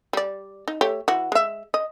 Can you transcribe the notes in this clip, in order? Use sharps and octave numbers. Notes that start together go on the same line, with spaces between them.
G3 D5
D#4
A3 G4 C#5
E3 F#4
G#3 E5
D#5